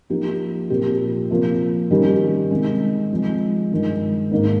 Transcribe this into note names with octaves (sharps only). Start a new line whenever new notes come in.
F3 A#3 D#4 G4
A#2 F3 C4 G4
C3 F3 A#3 F4
D#3 G3 C#4 G4
C3 D#3 G#3
C3 F3 G#3
G2 D#3 G#3
G#2 D#3 A#3